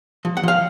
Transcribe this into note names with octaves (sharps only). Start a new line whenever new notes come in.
F3
F#5
F3 F5